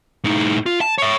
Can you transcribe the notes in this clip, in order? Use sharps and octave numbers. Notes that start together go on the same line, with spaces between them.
A2 D#4
F4
A5
C#5 E5